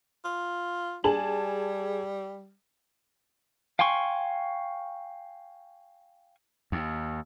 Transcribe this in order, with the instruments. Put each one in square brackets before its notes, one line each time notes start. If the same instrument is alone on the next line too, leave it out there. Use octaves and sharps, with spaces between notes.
[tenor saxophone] F4
[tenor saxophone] G3 [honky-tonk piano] G#4 A5 F#7
[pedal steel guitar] F5 G5 G#5 C6 C#6
[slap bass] D#2